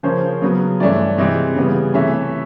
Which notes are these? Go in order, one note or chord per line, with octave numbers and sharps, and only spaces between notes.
C#3 F3 A#3 C#4 C5
C#3 F#3 B3
G2 E3 A3 C#4 D5
C3 E3 G#3 C4 D#5
C#3 E3 G3 B3
C3 E3 A3 C#4 E5